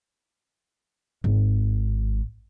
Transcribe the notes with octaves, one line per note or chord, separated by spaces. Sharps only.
G#1